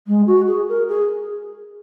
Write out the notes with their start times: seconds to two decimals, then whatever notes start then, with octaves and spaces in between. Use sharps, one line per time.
0.07 G#3
0.27 F#4
0.47 G#4
0.69 A#4
0.88 G#4